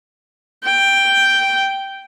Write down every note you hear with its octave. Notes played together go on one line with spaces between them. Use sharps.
G5